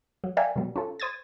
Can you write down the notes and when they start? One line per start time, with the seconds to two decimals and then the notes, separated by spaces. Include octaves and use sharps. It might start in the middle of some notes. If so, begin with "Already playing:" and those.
0.24 F#3
0.37 A#4 D5 E5 F5 G5 G#5
0.56 B2 F#3 G3
0.76 C#4 F4 A4
1.00 C5 D#6 G#6 A6